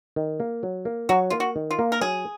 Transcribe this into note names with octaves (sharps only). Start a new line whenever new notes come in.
D#3
A#3
F#3
A#3
F#3 F#4
A#3 F4
F#4
D#3
F4
A#3
A#4
F#3 G#4